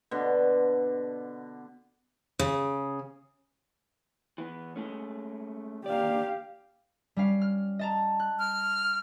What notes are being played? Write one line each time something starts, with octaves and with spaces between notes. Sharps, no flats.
B2 D3
C#3
E3 B3
G#3 A3 C#4
A#3 G4 D5 F5
G3 C#4 F5
F6
D#5 A5 A#5
F#6
F6